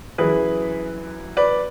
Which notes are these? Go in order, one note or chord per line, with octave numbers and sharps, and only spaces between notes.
F#2 E3 G#4 B4
B4 D5